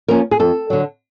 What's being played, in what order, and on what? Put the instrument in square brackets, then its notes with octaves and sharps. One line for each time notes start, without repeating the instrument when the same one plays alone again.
[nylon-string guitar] F3 A#3 C#4 A#4
G#4
F2 A4
D3 F#3